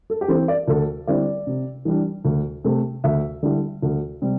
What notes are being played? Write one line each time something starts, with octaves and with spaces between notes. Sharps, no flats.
A4
G4
E3 C4 A4
D5
D2 A4
D3 G3 C4 E4 D5
C3
E3 G3 D4
D2
C3 A3
D2 E5
D3 G3 E4
D2
C3 G3